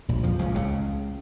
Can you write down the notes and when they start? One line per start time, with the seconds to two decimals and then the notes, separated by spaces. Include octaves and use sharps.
0.09 A#1 A#2
0.23 F2 F3
0.39 C#2 C#3
0.54 C#2 C#3